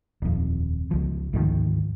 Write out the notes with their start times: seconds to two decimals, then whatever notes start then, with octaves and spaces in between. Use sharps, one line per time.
0.22 D#1 F2
0.91 C#2 F3
1.33 D2 G#2 D#3 F3